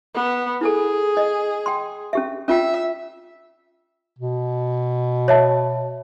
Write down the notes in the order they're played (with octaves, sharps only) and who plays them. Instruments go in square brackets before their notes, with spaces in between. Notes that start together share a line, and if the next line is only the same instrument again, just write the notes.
[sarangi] B3
[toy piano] E4 A4 [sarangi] G#4
[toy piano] D#5
G5 C6
C#4 G4 E5
[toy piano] C#4 F4 G5 [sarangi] E5
[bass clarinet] B2
[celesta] C#5 E5 A5